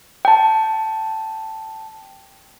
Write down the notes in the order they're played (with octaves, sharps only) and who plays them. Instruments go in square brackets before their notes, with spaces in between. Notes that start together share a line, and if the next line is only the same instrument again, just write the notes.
[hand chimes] G5 A5